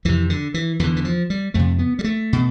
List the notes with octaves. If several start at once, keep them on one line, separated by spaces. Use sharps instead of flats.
F2 C3 E3
D3
E3
E2 D3 E3
E3
F3
G3
F2 C3 A3
B3
G3
A3
B2